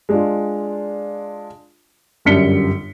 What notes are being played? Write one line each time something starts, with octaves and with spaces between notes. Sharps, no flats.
G#3 D4 F4
G1 F#2 G3 B6 C#7 G7